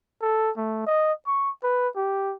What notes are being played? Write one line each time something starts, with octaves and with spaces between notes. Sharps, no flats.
A4
A3
D#5
C#6
B4
G4